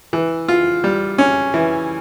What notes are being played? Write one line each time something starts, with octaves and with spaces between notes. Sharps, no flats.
E3
F4
G3
C#4
E3